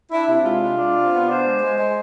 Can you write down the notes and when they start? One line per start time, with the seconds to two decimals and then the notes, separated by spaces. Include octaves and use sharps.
0.11 D4 E4
0.27 C3 E4
0.44 G#3 F4
0.61 D4
0.78 D4
0.95 C3
1.12 B3
1.27 D4 C5
1.45 G#3
1.62 G#3
1.78 G#3